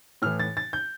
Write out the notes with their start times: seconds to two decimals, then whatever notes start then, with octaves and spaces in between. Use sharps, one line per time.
0.22 A2 E3 F6
0.40 A6
0.57 A6
0.73 G6